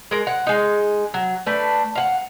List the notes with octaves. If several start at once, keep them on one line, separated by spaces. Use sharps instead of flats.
G#3 A#4
F#5
G#3 D#4
F#3
A3 D4 B4
F5 F#5